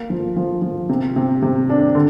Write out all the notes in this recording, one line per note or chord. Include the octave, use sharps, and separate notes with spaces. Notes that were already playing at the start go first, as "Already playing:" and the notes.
Already playing: A#3
F3
F3
F3
C3
C3
C3
D4
D3